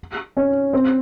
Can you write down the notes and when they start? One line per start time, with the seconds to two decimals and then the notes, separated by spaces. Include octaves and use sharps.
0.37 C#4
0.73 C4